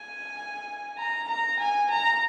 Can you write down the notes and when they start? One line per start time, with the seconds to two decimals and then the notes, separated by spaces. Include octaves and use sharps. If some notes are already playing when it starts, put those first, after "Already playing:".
Already playing: G#5
0.98 A#5
1.29 A#5
1.59 G#5
1.91 A#5